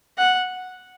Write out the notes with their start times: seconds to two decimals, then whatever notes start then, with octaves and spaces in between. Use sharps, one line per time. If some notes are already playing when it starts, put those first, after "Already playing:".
0.17 F#5